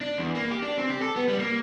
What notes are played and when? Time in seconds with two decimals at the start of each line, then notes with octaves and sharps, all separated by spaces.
0.01 D4
0.18 E2
0.35 A#3
0.51 G4
0.62 D4
0.78 C4
0.90 G4
1.02 A4
1.16 B3
1.28 G3
1.39 A#3